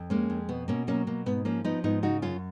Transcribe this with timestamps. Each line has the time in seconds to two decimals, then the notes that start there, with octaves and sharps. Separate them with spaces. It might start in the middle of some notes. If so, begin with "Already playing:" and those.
Already playing: F2
0.10 G#3 A#3 C#4
0.30 F2
0.49 B2 B3
0.68 B2 A#3 C#4
0.87 F#3 A#3 C#4
1.07 B2 A#3
1.26 G#2 B3
1.45 F3 A#3 C#4
1.64 F3 B3 D#4
1.84 G#2 B3 D#4
2.03 C#3 D#4 F#4
2.22 F#2 C#4 F4